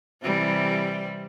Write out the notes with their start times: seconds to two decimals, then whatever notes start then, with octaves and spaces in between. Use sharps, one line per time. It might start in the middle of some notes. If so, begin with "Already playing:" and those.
0.22 C3 E3 G3